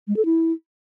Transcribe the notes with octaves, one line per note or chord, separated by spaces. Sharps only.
G#3
A4
E4